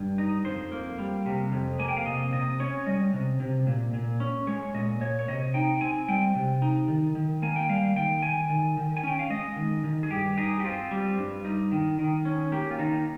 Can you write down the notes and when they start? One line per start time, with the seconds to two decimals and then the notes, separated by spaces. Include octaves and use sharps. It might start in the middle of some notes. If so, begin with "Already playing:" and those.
Already playing: G2
0.18 D#4
0.45 F2 C5
0.72 A#3
0.98 G3
1.26 C3
1.52 F2
1.79 A#3 G#5
1.88 G5
1.97 F5
2.06 C3 D#5
2.33 C3 D#5
2.60 C#4 C#5
2.86 G3 D#5
3.13 C3
3.40 C3
3.67 A#2
3.94 A#2
4.20 C#4
4.47 G#3 C#5
4.74 A#2 D#5
5.01 A#2 C#5
5.19 C#5
5.28 C3 D#5
5.54 D#4 G5
5.81 C4 G#5
6.08 G3 G5
6.35 C3
6.62 D#4
6.88 D#3
7.15 D#3
7.42 A#3 G#5
7.56 G5
7.69 G3 F5
7.96 D#3 G5
8.22 D#3 G#5
8.50 D#3
8.77 D#3
8.97 G#5
9.03 C#4 G5
9.19 F5
9.30 G#3 D#5
9.56 D#3
9.84 D#3
10.03 G#4
10.11 G2 G4
10.38 D#4 G#4
10.60 G4
10.64 C4 F4
10.91 G3
11.18 G2
11.45 D#4
11.72 D#3
11.99 D#3
12.25 C#4
12.52 A#3 G4
12.71 F4
12.79 D#3 D#4